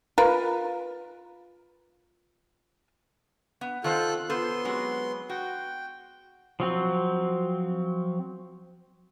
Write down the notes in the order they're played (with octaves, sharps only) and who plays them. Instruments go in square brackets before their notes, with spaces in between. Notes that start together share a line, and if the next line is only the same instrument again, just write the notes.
[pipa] F4 A#4 B4
[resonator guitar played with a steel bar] B3
[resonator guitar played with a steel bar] D#3 C4 C5 [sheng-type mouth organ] F4 A4 F#6
[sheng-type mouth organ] B3 C6 [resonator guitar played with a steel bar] F4 A4 C5
[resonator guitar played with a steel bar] F#3 G#3 C4
[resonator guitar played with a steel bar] F#4 [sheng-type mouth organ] G5
[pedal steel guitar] F3 F#3 C4